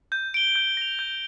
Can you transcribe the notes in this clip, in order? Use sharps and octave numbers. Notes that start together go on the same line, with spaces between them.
G6
D7 G7
G6
A#6 F7
G6